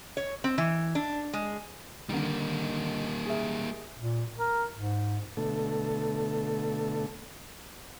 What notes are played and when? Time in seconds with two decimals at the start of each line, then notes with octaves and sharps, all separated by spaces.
0.17 C#5
0.44 C4
0.58 E3
0.95 D4
1.33 G#3
2.09 D3 D#3 G3 A#3 D#4
3.26 G#4 A#4 E5
4.00 A#2
4.38 A#4
4.76 G#2
5.37 B2 D3 A3 A4